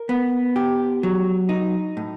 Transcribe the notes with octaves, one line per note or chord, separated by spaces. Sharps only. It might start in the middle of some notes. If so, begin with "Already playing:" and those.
Already playing: A#4
B3
G4
F#3
D#4
A2